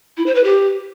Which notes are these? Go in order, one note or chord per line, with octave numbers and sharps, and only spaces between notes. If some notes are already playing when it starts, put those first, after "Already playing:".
E4
C5
B4
G4